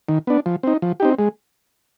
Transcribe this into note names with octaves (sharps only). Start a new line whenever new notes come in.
D#3
B3 D4
F3
C4 D#4
F3
C4 D#4 G4
G#3